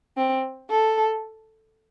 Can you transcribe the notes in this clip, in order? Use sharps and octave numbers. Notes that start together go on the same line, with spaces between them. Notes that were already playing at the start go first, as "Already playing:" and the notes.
C4
A4